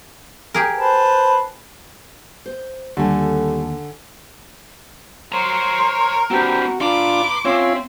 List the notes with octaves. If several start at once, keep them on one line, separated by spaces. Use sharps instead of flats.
G4 G#4 A#4
B4 C5 A5
C5
D#2 D3 G3 A3 G#5
A#4 C5 C#5 A#5 C6
C4 D4 F#4 G4 B4 C5
D4 F4 B4 A#5 C6 D6
C4 C#4 F4 C#5 E5 C6 E6